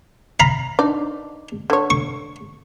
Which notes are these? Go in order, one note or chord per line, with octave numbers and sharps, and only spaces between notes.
F5 A#5 B5
D4 D#4 D5
D3 C#5
C#6